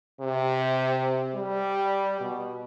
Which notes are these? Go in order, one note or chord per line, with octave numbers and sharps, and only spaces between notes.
C3
G3
B2